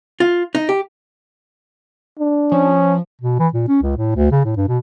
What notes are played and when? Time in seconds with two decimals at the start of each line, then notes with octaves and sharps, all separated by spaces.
0.20 F4
0.55 D#4
0.69 G4
2.19 D4
2.52 F3 C#4
3.21 B2
3.39 E3
3.53 A#2
3.68 C#4
3.83 C#2
3.97 A2
4.16 D2
4.31 C#3
4.45 A2
4.56 G2
4.68 B2